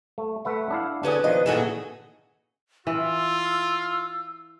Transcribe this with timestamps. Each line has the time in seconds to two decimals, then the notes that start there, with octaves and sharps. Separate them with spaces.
0.18 A3
0.45 A3 B4 E5 F#5
0.71 D4 E4 F5
1.03 D3 F#3 C#4 D4 G#4 B4
1.24 B2 D#3 F3 D#5
1.46 A#2 D#3 E3 F#4 G#4 A4
2.87 E3 F4 E6